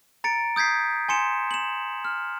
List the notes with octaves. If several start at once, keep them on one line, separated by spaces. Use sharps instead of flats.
A#5 A6 C#7 D7
D#6 G6 G#6 B6 C7
G#5 C6 C#7 E7
E7 F#7
F6